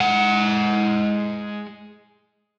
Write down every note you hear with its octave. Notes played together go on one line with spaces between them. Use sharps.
G#3 F#5